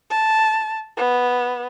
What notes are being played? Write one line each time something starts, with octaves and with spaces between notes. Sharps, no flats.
A5
B3